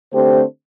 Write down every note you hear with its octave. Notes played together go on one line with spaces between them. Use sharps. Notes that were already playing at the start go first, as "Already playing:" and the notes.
D3 A3 C4 G4 C5